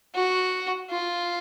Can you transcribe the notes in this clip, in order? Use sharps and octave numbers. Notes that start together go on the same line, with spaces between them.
F#4
F4